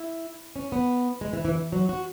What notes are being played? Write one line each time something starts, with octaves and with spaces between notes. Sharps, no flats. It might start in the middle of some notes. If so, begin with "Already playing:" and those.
Already playing: E4
C#4
B3
G#3
E3
E3
E3
F#3
F#4